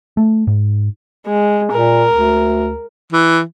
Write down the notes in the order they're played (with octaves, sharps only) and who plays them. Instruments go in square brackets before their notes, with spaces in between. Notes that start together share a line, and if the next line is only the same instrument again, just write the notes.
[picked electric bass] A3
G#2
[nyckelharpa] G#3
[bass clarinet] A#2 [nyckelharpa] A#4
[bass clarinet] D2
[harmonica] E3